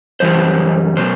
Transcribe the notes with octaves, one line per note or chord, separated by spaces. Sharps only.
F#2 E3 G3 C5
B2 F#3 C5